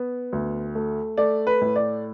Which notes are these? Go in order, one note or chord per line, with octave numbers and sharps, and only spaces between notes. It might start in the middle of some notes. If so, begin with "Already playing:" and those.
Already playing: B3
D2
A3
A3 D5
B4
A2
D5